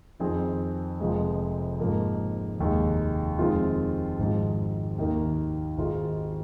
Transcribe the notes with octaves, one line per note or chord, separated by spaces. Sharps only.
F2 D#3 C4 G#4
F1 F2 F3 G#3
G#2 F3 A#3
F1 D#2 D#3 G#3
F2 D#3 G#3 C4 F4
G#1 G#2 F3
D#2 D#3 A#3 D#4
G#1 G#2 G#3 F4